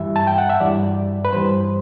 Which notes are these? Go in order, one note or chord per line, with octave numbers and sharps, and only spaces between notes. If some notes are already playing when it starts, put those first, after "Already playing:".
Already playing: G2 E3 G3 E5
A5
G5
F#5
E5
G2 E3 G3 D5
B4
G2 E3 G3 C5